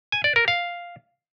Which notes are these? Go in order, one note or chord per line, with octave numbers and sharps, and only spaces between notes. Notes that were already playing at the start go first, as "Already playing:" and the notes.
G#5
D5
A#4
F5